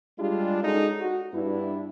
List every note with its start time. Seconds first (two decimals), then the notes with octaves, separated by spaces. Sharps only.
0.19 G3 G#3 D4 F4 G4 G#4
0.63 G#3 C#4 D#4 F#4 G#4 A4
1.00 F#4
1.33 G2 B3 D4 E4